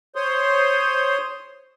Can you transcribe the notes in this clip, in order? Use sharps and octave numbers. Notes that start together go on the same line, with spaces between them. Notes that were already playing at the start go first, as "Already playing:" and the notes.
C5 C#5 C6 D#6